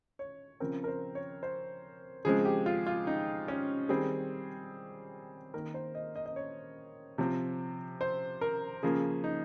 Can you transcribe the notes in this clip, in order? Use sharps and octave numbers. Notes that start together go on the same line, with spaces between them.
C#5
C#3 F3 C4 A#4
A#4
C5
C#5
C5
C#3 F3 G#3 C4 G#4
G4
F4
F4
D#4
C#4
D#3 G3 C4 G#4
D#3 A#3 A#4
C5
D#5
D#5
D#5
C#5
C3 F3 C4
C5
A#4
C#3 F3 A#3 G#4
D#4